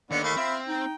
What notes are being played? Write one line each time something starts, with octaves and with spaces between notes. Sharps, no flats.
D#2 D3 B3 D5
A3 A#3 B5
C4 F4 E5
D#4 G5